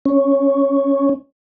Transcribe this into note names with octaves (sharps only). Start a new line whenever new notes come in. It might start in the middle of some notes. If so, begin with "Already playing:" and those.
C#4